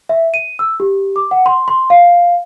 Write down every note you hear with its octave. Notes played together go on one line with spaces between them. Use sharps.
E5
D#7
E6
G4
D6
F#5
C6
C6
F5